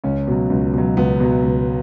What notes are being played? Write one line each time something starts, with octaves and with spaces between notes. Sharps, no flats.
C#2 C#4
B2 F#3
C#2
B2 F#3
C#2 B3
B2 F#3
C#2